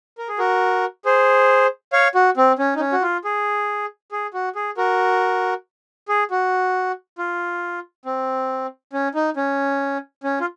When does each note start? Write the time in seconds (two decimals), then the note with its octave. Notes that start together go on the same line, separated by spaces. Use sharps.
0.18 A#4
0.29 G#4
0.39 F#4 A#4
1.05 G#4 C5
1.93 C#5 F5
2.15 F#4
2.37 C4
2.59 C#4
2.76 D#4
2.80 C#4
2.92 F#4
3.02 F4
3.24 G#4
4.12 G#4
4.34 F#4
4.55 G#4
4.77 F#4 A#4
6.08 G#4
6.31 F#4
7.18 F4
8.05 C4
8.93 C#4
9.15 D#4
9.37 C#4
10.24 C#4
10.40 F4